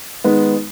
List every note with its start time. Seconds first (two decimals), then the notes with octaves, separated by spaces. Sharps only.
0.24 D#3 G#3 B3